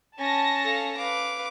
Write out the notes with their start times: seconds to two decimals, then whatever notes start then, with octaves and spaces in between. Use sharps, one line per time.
0.19 C#4 A5 A#6
0.63 A4 F5
0.97 B4 F5 D6